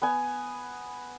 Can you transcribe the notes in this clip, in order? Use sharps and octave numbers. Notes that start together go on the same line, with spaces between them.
B3 G#5